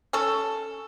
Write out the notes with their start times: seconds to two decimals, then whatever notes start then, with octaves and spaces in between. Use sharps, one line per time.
0.13 C#4 A4